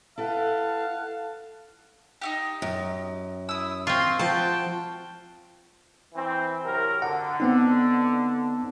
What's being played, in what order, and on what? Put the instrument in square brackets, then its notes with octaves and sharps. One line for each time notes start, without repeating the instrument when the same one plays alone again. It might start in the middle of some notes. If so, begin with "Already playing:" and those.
[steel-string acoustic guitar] E4 A4 B4 [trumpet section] F5 F#5 A5
[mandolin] D#4 E4 G4
[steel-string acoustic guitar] F#2
[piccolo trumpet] E4 [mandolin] D#6 E6
[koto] C4 F4 [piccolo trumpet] C6 [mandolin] C#6
[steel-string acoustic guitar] F3 A5 [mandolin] F#4 [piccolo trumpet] G5
[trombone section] E3 C4
C3 F#3 A#4
[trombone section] D3 [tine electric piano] F#5
[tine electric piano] B3 C4 D#4